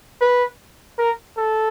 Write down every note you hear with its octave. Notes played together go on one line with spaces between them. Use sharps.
B4
A#4
A4